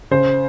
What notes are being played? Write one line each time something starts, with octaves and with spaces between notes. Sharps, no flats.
C#3 C5